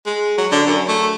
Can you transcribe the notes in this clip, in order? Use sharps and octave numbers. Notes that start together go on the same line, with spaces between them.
G#3
F#3
D3
F#2
A3